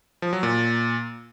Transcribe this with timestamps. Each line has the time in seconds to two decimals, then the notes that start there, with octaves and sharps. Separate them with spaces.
0.22 F3
0.33 F#3
0.43 A#2